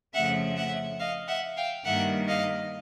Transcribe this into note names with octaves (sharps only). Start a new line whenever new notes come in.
F2 C#3 F3 A3 E5 F#5
E5 F#5
D#5 F5
E5 F#5
F5 G5
G2 D#3 G3 A#3 E5 F#5
D#5 F5